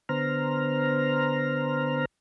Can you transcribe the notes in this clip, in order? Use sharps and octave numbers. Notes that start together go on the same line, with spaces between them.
D3 B3 C5 A#5 F6